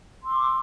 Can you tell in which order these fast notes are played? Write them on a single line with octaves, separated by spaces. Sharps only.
C6 E6 D6